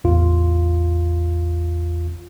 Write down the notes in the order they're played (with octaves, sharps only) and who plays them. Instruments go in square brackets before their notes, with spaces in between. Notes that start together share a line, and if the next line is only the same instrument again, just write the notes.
[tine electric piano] A1 E2 F4